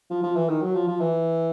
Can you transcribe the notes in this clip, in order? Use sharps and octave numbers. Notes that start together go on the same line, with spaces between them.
F3
F3
E3
D#3
F#3
F3
F3
E3